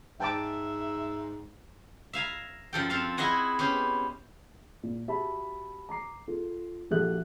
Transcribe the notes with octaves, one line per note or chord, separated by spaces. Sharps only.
G#2 E5 G5 A5 D6
E5 F5 G#5 A#5
F#2 F3 A4 G5
C4 A4 F5 A5
E4 G#4 D#5 F#5 G#5
B3 C#4 G4 C5
A#2
F#4 G4 E5 A5 B5
A#5 D6 C7
F4 A4
A#1 F#4 G4 A4 E5 F#6